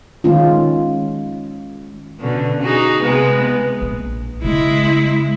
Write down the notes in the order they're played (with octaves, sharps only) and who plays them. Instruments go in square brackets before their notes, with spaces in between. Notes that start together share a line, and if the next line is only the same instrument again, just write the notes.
[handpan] D#3 G#3 C#4 F4
[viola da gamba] B2 D3 C#4
D#4 F#4 G#4
C3 G#3 B3
[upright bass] A#1
[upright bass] C#3 B3 [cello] G#3 E4